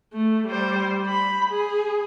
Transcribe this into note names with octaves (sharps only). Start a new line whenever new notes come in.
A3
G3 C5
B5
G#4